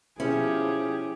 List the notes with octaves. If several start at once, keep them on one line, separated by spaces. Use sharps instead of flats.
B2 F3 C#4 E4 G4 G#4 C#5